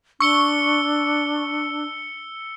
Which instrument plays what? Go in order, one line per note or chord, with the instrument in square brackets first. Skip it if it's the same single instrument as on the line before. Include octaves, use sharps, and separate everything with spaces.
[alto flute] D4 [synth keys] C#6 [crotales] E6 C#7 G7